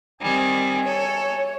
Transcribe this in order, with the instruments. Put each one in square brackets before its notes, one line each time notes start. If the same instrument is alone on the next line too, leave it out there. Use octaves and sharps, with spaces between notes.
[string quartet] D#3 G3 C4 [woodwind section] G#5
[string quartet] A4 [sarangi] C#5